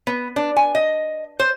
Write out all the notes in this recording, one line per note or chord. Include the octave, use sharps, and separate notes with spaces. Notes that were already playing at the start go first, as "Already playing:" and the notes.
B3
D4
G#5
D#5
C5